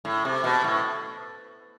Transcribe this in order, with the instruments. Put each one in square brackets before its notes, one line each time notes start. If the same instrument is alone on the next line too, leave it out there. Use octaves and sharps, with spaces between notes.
[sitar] A2
C3
B2
A2